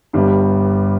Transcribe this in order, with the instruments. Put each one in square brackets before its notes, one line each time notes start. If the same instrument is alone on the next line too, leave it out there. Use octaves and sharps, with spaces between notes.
[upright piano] G1 G2 G3